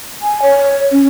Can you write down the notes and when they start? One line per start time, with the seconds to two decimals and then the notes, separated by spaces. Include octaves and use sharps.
0.22 G#5
0.42 C#5
0.92 C#4